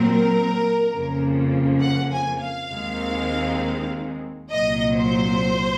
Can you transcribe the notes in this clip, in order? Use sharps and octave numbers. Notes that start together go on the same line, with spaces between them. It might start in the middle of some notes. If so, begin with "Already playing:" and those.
Already playing: A#2 F#3 C4 A#4
F2 C#3 F3 A#3
F#5
G#5
F5
D#2 D#3 G#3 C4
C2 A#2 F#3 D#5
C5